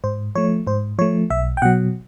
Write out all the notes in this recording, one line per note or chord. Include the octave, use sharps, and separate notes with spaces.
G#2 C5
F3 A3 C#5
G#2 C5
F3 A3 C#5
B1 E5
G5
B2 F#3 F#5